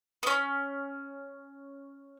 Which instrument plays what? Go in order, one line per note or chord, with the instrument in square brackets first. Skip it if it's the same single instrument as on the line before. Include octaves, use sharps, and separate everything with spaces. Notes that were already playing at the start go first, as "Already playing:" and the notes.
[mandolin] B3 C#4